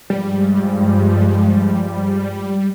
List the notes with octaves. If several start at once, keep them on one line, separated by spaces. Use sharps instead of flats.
G2 F3 G3 G#3